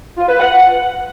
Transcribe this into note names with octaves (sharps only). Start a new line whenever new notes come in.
F4
B4
F#5